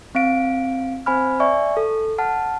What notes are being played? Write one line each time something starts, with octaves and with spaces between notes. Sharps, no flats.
C4 F5 D7
C4 C5 G#5 B5 F6
D5 E5 G#5 C#6
A4
F#5 A5 F6